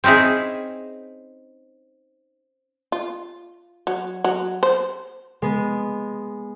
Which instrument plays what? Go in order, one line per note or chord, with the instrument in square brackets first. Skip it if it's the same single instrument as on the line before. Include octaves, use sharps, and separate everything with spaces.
[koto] C4 C#4 D#4 E4 G#4
[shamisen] F4
F#3
F#3
C5
[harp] G#3 B3